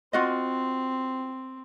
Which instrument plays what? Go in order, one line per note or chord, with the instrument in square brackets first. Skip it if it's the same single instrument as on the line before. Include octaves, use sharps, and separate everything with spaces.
[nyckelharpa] C4 [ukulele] F4 F#4 D#5